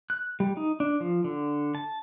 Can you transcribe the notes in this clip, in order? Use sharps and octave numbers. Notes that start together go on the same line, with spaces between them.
F#6
G3
D#4
D4
F3
D3
A5